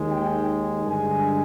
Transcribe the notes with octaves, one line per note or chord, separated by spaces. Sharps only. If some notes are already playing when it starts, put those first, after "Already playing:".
Already playing: D#2 D#3 G#3
G5
G2 D3 G#3 G#5